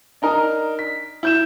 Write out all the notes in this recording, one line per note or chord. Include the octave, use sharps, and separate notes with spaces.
D4 D#4 A#4 A#5 D#6
B6
E4 G6 E7